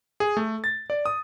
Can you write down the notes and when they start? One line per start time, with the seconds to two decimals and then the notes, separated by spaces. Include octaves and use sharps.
0.20 G#4
0.37 A3
0.64 A6
0.90 D5
1.06 D#6